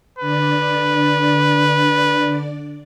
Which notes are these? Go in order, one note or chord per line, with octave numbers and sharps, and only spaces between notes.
D3 D4 B4 D5